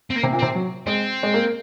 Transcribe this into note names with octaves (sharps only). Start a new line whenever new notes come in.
C4
A#3
C3
A#2
C4
C3
F#3
G#3 C4
G#3
A#3